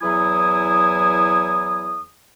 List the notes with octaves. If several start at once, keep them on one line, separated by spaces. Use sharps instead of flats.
E2 F#3 E4 G#5 D#6